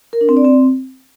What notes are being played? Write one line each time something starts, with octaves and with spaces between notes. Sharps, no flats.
A#4
D4
C4
D5
C4